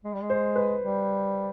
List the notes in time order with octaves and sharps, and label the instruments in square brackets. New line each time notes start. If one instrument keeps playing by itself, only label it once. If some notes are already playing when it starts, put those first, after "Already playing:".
[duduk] G#3
G3
G#3
[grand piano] C5
B4
[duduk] G3